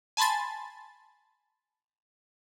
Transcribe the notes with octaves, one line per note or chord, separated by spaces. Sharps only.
G#5 A5 B5 C6 A6